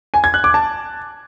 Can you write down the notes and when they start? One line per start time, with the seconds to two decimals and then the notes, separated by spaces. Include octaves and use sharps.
0.14 G#5
0.24 G#6
0.34 F#6
0.44 D6
0.54 A5